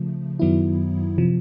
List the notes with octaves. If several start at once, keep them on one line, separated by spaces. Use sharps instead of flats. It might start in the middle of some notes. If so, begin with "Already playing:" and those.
Already playing: C#3 F3 A3
F#2 D#3 F#3 B3 E4
C3 F3